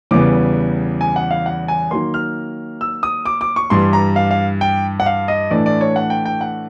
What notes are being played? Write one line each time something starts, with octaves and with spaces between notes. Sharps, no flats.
E2 C#3 E3 G3 B3 D6
G#5
F#5
F5
F#5
G#5
D#3 F#3 A#3 C6
F6
E6
D#6
D6
D6
C#6
G2 E3 G3 C6
A#5
F5
F5
G5
F#5
F5
D#5
A2 E3 A3 D4 D5
D5
C#5
F#5
G5
G5
F#5